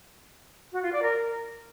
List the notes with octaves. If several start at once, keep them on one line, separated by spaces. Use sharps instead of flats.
F#4
F4
D5
A#4